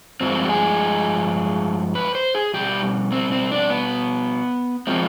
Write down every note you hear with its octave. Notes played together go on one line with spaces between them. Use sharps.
G2 F3 G#3 C4
G4
G#4
B4
C5
G#4
B2 G3 G4
C4
C4
D4
B3
C3 F3 G#3 C4